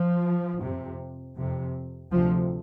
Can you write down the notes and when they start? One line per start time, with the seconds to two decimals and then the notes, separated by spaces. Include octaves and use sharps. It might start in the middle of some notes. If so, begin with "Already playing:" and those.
Already playing: F3
0.61 F2 C3
1.36 F2 C3
2.11 D2 C3 F3